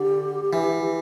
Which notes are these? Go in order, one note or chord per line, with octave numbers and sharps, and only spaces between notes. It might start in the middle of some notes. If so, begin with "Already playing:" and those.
Already playing: D3 G4
E3